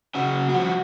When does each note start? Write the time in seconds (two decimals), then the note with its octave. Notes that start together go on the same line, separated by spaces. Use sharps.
0.15 C#3 F#4
0.49 F3 F#4